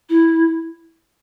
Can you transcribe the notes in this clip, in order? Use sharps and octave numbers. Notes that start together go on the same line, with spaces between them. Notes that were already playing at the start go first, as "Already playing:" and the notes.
E4